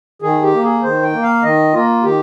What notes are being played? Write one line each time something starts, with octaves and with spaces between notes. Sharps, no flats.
D#3 G#4
G4
A#3
G#4
D#3 C5
G5
A#3
F5
D#3 D#5
A#3 F4
D#3 G4